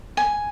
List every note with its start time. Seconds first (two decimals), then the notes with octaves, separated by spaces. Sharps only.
0.17 G#5